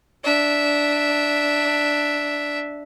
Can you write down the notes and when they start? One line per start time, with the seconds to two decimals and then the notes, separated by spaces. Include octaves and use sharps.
0.24 D4 E5